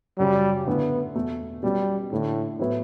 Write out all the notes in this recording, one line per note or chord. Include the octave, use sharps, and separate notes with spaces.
F#2 C#3 F#3 G3
D3 A3 B3 E4
E2 B2 A3
B2 F#3 G3 C#4 G4
A2 D3 A3 D4
A2 F#3 B3 E4